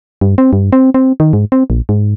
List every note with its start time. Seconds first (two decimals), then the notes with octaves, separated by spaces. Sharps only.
0.21 G2
0.38 C4
0.53 G2
0.73 C4
0.94 C4
1.20 D#3
1.33 G#2
1.52 C4
1.70 A#1
1.89 G#2